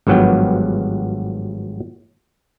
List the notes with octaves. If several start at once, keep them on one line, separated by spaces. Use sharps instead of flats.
G#1 G2 F3 F#3 B3 G5